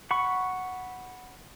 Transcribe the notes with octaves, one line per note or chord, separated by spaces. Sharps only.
F#5 B5 C#6